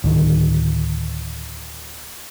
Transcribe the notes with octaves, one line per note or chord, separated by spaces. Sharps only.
D1 D#3